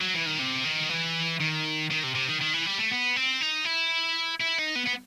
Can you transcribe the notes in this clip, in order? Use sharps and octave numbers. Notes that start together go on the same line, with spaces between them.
F#3
E3
D#3
C3
D#3
E3
D#3
D#3
C3
C3
D#3
D#3
E3
G3
A3
B3
C4
D#4
E4
E4
D#4
B3
B3